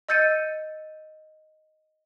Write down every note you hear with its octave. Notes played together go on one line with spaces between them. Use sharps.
D#5 E6 G6 A6 C#7 D#7